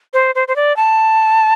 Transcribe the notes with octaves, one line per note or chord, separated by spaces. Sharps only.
C5
C5
C5
D5
A5